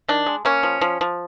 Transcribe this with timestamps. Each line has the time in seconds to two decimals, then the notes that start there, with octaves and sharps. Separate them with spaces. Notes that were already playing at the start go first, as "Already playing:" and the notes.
0.08 D#3 D4
0.26 G#3
0.45 A#3 C#4
0.63 F3
0.81 F3
1.01 F3